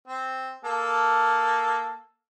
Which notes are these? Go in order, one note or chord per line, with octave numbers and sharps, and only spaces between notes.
C4
A#3 A4 A5